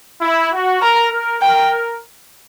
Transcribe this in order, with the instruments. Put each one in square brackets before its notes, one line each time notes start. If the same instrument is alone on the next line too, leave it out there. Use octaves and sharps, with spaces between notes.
[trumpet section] E4
F#4
[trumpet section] A#4 [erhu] A#5
[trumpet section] A#4
[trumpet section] A#4 [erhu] G5